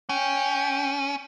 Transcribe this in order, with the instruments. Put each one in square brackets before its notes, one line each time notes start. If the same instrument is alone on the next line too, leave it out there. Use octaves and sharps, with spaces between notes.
[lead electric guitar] C#4 [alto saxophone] G5